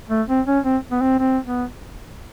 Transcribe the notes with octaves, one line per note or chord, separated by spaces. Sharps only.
A3
C4
C#4
C4
B3
C4
C4
B3